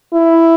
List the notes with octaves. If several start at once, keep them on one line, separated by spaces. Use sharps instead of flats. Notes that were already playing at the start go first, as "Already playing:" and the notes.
E4